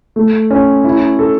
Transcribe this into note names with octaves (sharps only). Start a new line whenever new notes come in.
A3
C#4
E4
A4